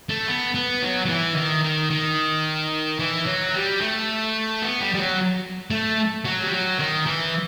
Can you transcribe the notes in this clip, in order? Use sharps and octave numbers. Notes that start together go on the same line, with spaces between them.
A3
B3
B3
F#3
F#3
E3
D#3
D#3
D#3
E3
F#3
G3
A3
B3
G3
G3
F#3
A3
F#3
G3
F#3
D#3
E3